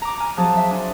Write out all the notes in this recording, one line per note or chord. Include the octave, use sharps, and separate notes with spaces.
A#5 D6
G#5 A#5 F6
F3 F#3 C4 G#4 A5
E5
D4 G#5 C6